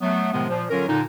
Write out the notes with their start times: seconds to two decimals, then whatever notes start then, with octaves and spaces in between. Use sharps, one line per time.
0.01 F#3 A3 B3
0.32 A2 C3 D#3 F3 G#3 B3
0.49 A#2 F3
0.70 D3 F#3 C#4 F4 A#4
0.88 A#2 D3 D#4